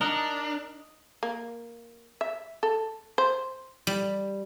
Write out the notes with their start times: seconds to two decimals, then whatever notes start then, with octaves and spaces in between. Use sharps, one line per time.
0.01 D4 D#4 A#4 D#5 F#5
1.23 A#3
2.21 E5
2.63 A4
3.18 C5
3.87 G3